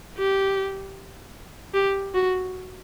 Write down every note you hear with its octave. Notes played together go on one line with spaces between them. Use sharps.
G4
G4
F#4